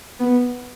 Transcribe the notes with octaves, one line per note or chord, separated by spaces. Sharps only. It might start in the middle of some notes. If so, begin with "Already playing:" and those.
B3